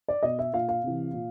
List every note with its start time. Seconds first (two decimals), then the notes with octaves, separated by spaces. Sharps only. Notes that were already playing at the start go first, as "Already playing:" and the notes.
0.08 D5
0.23 B2 D#5
0.39 E5
0.53 A#2 F5
0.68 F5
0.84 C3 E3
1.13 A#2